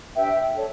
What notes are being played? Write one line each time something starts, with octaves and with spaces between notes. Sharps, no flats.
D4 G4 B4 E5 G5
D4 A4 C#5